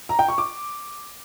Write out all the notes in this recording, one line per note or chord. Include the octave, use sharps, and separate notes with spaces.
A#5
G5
C#6
D6